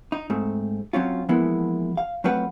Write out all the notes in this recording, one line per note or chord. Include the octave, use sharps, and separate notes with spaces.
D#4
G#2 A3 C4
F#3 C4 C#4 F4
E3 F3 G#3 A#3 B3 E4
F5
F#3 A3 C4 F4 B4 F#5